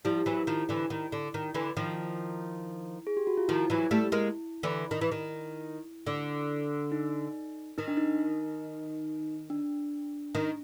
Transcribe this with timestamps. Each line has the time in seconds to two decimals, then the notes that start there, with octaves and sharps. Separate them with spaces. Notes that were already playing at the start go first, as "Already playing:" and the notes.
0.05 F3 G3 E4
0.26 E3 F#3
0.47 D#3 F3
0.69 D3 E3
0.90 D#3
1.12 D3
1.34 D#3
1.54 D3 E3
1.77 D#3 F3
3.07 G#4
3.17 G4
3.27 F#4
3.37 F4
3.48 D#3 F3 E4
3.70 E3 F#3
3.91 G3 A3
4.12 G#3 A#3
4.63 D3 E3
4.91 D#3
5.01 E3
5.12 D#3
6.06 D3
6.92 D#4
7.78 D#3 D#4
7.88 D4
7.97 D#4
9.50 D4
10.35 D#3